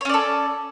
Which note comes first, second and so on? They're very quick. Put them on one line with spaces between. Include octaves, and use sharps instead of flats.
C#5 C#4 D5 A4